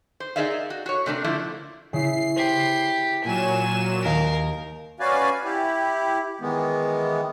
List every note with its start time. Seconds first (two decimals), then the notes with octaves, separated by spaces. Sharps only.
0.20 C5
0.36 D#4 G#4 A#4 D5 E5 F5
0.70 F#4
0.86 F#4 C#5
1.06 C3 A3 D4 A#4
1.24 D3 F3 A3 A#3 E4
1.93 C#3 E4 C7
2.36 G4 C5 B5
3.24 A#2 F#3 G#5 E7
4.02 D#2 A#4 F5 D7
5.00 C#4 F#4 B4 D5 F5 G#5
5.44 E4 G4
6.41 D#3 E3 G#3 B3